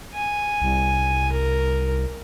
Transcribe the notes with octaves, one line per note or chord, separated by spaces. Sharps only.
G#5
C2
A#4